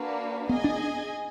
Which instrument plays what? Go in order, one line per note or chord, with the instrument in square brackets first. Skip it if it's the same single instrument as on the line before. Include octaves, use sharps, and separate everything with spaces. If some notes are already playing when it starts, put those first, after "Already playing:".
Already playing: [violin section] A#3 D4 F#4 B4
[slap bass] B3 [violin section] G#4 D#5 G#5
[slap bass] D4